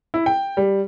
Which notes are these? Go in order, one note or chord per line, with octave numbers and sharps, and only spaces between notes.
E4
G5
G3